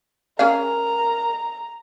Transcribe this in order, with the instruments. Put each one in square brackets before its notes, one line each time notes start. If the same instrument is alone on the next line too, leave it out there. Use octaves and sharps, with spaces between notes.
[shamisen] C#4 G#4 F5 [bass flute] A#4 [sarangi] A#5